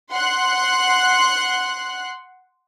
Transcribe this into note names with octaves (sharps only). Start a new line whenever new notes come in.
F#5 C6 F#6